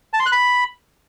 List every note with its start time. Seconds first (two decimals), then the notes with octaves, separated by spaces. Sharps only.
0.13 A5
0.20 C6
0.26 F#6
0.32 B5